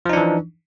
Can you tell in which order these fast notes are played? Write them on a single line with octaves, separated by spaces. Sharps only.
F3 D#4 D4 E3